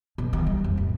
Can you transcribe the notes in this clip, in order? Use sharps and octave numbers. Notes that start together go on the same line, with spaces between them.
B2
D#3
G3
F2
A1